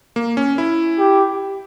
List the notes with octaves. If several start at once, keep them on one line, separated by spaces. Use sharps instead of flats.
A#3
C#4
E4
G4